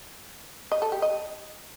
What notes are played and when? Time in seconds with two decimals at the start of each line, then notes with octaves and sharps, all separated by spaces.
0.72 D#5
0.82 A4
0.92 G4
1.02 D#5